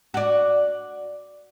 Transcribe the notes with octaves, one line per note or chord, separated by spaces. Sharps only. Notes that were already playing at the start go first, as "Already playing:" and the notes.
F#4 D5